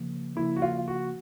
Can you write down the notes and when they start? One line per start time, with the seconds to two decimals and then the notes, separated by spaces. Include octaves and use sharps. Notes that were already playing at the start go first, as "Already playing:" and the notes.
Already playing: C#3 F3 A#3
0.36 C#3 F3 A#3 E4
0.56 F#4
0.62 F4
0.88 F#4